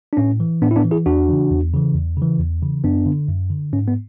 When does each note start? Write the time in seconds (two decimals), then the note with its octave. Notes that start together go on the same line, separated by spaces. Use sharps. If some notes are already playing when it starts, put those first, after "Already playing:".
0.13 D4
0.17 A2 C#4
0.40 E3
0.62 A2 B3 D4
0.71 E4
0.76 B3 D4
0.84 E3
0.91 E4 G#4
1.06 E2 D4 F#4
1.29 C#3 E3
1.51 E2
1.73 C#3 E3
1.95 E2
2.17 C#3 E3
2.39 E2
2.62 C#3 E3
2.84 F#2 B3 D4
3.06 D3
3.28 F#2
3.50 D3
3.73 G#2 C#4
3.88 B3